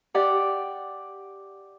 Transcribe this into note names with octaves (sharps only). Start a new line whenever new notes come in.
G4 D5 F#5